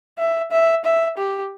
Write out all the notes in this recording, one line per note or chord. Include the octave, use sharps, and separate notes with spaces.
E5
E5
E5
G4